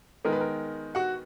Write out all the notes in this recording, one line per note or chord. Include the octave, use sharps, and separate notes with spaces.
D#3 G#3 B3 A#4
B4
A#4
F#4 F#5